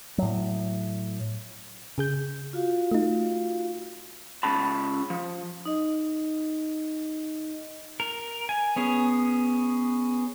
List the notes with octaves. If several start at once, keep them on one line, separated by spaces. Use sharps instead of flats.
A2 F#3
C#3 G#4 G6
F4 F#4 F5
A3 D#4
C#2 C#3 A5 B5
F3
D#4 D#5
A#4
G#5
B3 C#4 G#4